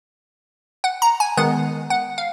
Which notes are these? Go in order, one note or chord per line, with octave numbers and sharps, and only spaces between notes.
F#5
A#5
G#5
D#3 G#3 B3 F#5
F#5
F5